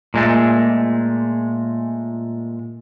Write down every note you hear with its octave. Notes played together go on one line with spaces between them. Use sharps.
A#2 G#3 A3